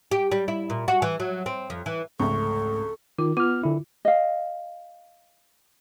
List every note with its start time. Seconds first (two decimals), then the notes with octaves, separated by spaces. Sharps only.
0.11 G4
0.32 G3
0.48 E4
0.70 A#2
0.88 F#4
1.02 E3
1.20 F#3
1.46 C4
1.70 F2
1.86 E3
2.20 F1 C#2 G#2 A3 A4 C#6
3.19 D#3 F4
3.37 B3 F4 F6
3.63 D3 E4
4.05 D#5 F5